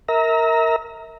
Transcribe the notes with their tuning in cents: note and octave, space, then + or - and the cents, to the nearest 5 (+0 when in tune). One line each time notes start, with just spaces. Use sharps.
A#4 -10 E5 -40 A#5 +0